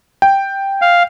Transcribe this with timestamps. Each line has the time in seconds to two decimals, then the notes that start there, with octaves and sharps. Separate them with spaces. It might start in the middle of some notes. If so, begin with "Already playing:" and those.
0.22 G5
0.82 F5